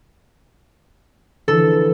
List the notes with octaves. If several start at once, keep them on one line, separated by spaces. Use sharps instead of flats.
D3 E3 F3 A4